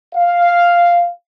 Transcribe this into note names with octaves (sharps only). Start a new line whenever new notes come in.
F5